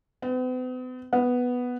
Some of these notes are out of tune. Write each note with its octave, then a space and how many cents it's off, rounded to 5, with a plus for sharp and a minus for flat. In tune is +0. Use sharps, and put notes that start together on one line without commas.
B3 +45
B3 +0